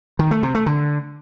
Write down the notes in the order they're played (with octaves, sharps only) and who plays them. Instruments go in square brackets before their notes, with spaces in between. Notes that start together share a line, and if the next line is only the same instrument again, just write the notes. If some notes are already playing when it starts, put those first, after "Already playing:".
[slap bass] D#3
A3
C3
A3
D3